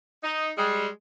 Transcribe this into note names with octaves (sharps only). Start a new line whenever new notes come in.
D#4
G3 G#3